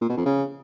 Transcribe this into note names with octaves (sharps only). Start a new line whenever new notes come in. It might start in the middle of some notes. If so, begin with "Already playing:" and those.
A#2
B2
F2
C#3